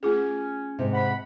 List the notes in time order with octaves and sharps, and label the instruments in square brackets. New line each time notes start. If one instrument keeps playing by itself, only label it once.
[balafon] A3 F4 G#4 [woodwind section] C#4
[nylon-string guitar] G#2 C3
[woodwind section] F#5 B5